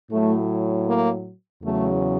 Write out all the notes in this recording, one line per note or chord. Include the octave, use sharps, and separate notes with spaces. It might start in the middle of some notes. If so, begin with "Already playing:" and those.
A2 F#3 A3
A#3
E2 C#3 F#3 A3